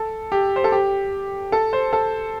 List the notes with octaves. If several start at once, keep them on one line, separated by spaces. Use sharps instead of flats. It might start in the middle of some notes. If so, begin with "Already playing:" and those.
Already playing: A4
G4
C5
A4
G4
A4
C5
A4